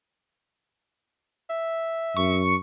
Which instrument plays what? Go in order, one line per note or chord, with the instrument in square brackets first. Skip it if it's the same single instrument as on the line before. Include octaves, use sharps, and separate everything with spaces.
[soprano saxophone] E5
[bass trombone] F#2 [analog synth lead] C#6